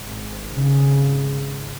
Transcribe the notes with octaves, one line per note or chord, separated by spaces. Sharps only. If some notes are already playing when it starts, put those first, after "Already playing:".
Already playing: G#1 G#2
C#3